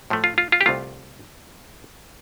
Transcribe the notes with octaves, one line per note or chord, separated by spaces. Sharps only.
A2 F3 A3
F4
F4
F4
G4
C2 C3 A3 F4